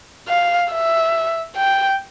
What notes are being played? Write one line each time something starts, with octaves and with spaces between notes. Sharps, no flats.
F5
E5
G5